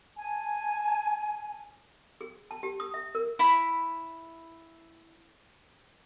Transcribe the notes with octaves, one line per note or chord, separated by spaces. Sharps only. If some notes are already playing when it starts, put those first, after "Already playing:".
G#5 A5
G#4
A5
G4
D#6
E5
A#4
E4 B5